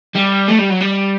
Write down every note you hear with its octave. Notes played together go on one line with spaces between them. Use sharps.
G3
A3
G3
F#3
G3